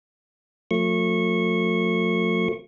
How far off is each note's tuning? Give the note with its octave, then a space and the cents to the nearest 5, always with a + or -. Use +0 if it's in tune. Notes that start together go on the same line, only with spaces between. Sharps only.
F3 +45 A3 +35 C#6 -20